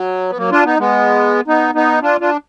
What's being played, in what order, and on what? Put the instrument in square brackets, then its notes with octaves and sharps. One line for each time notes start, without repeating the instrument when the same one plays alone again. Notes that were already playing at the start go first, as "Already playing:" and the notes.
Already playing: [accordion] F#3
B3
F#3 A#3
D4 F4
B3 D#4
G#3 B3
B3 D#4
B3 D#4
D4 F4
D4 F4